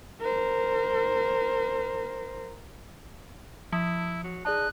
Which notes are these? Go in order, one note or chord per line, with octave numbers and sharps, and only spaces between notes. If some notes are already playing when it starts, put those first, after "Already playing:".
A#4 C5
F3 E4
F#3
D#4 G#4 D5 A5 F#6